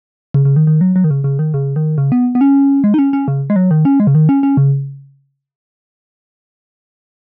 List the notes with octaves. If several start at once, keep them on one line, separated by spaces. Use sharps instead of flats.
C#3
C#3
D#3
D#3
F#3
F#3
D#3
C#3
C#3
D#3
C#3
D#3
C#3
B3
B3
C#4
G#3
D#4
C#4
C#4
C#3
G#3
F#3
D#3
C#4
G#3
C#3
D#3
C#4
C#4
C#3